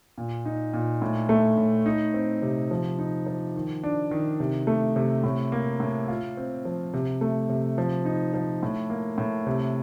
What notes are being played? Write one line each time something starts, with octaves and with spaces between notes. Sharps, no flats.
A#2
D#4
A#2
A2
A3
A2
D#4
C4
C3
F3
D#4
F3
D#3
D4
D#3
C3
A3
C3
A2
A#3
A2
F4
C4
F3
C3
A3
C3
F3
D#4
F3
A2
A#3
A2
C3